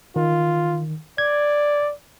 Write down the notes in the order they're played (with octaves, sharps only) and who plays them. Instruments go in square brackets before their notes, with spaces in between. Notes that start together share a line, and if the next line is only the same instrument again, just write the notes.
[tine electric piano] D#3 [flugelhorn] F4
[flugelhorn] D5 [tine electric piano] G#6